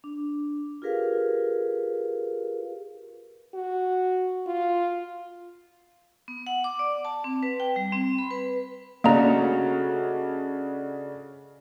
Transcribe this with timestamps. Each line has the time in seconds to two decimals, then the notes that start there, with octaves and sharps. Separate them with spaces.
0.04 D4
0.82 F4 G4 G#4 A#4 B4 F5
3.55 F#4
4.47 F4
6.28 B3
6.47 F#5
6.64 D6
6.79 D5
7.05 A5
7.24 C4
7.43 B4
7.60 G5
7.76 G3
7.92 C4
8.18 B5
8.31 B4
9.04 C#3 A3 A#3 C#4 D4 F#4 D#5 A#5